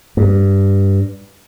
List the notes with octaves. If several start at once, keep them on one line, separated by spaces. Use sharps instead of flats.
G2